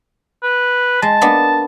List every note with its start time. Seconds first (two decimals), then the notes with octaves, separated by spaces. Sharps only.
0.43 B4
1.02 G#3 A5
1.21 A#3 B3 D4